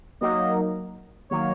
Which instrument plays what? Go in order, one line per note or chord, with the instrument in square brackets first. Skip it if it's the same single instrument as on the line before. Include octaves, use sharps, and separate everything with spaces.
[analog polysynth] F#3 A#3 D#4 A#4 [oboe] D#5
[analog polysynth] D#3 F#3 A#3 [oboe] C#5